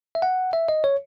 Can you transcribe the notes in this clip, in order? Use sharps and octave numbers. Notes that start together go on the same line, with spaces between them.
E5
F#5
E5
D#5
C#5